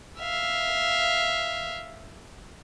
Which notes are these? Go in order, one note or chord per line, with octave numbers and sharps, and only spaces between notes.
E5 F5